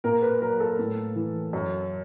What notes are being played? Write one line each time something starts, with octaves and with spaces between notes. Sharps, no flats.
A#2 A#4
B4
F#3 A#4
A4
A2
E3
F#2